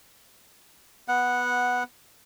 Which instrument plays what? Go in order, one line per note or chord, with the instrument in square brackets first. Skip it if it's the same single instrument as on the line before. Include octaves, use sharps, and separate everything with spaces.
[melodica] B3 F#5